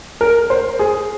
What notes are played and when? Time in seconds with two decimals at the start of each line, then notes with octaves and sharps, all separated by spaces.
0.21 A#4
0.50 C5
0.79 G#4